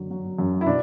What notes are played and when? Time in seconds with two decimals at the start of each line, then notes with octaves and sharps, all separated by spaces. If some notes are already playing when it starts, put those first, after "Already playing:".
Already playing: F#2 D3 F#3
0.11 F#3
0.38 F#2
0.61 E4
0.66 B2 D4